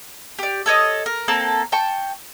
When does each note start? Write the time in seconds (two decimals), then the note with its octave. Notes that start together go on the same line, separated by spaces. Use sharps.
0.39 G4 D5
0.66 A4 C#5 D#5
1.06 A#4
1.28 A#3 C4 A4 A5
1.72 G5 A5 C#6